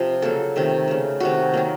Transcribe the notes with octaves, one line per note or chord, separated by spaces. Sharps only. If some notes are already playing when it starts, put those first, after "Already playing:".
Already playing: C3 F3
C#3 F#3 A#3 A4
C3 D#3 A3
C#3 A3
C3 D#3 A3 F#4
D#3 F#3 A#3